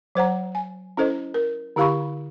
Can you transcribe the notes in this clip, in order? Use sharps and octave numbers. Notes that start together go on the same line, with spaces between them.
F#3 C5 F#5 A#5
G#5
C#4 E4 A4 C5 D#5
A#4
D3 E4 G4 F5 B5 C#6